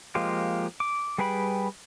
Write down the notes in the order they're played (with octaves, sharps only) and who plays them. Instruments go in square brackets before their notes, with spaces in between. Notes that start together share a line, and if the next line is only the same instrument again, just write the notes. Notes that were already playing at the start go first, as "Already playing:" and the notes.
[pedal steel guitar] F3 G#3 A#3 F4 G4
D6
G3 G#4 B4 G5 B5